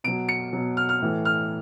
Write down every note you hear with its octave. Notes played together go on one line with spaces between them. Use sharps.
B2 F#3 D7
C#7
B2 F#3
F6
F6
A2 E3
F6